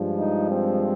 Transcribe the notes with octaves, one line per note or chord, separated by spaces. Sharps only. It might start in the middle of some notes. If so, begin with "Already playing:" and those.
Already playing: G2 F3 G#3
D#4
C4